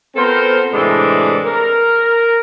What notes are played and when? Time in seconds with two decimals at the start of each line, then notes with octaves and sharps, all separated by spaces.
0.16 B3 C4 F4 A4 A#4 C5
0.73 A2 C3 E3 G#3 D4
1.45 A#4